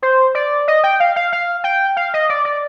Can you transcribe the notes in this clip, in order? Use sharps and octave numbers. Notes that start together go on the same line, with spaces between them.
C5
D5
D#5
G5
F5
F5
F5
G5
F5
D#5
D5
D5